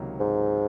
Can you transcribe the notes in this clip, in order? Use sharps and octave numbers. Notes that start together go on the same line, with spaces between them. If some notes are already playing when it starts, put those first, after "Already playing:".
Already playing: C#2 C3 D#3 F#3 A#3
G#2